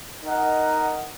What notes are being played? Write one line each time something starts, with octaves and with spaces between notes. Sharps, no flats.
D#4 A#4 D#5 F#5